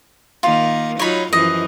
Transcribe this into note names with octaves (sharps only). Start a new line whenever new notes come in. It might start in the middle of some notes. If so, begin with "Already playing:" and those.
D#3 A#3 F4
F#3 D#4 F4 C#5 B5
F#2 E3 F3 D#5